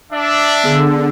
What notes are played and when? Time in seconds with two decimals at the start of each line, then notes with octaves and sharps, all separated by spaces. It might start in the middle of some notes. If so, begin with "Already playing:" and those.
0.12 D4 E5
0.64 D3 B3 G#4 E6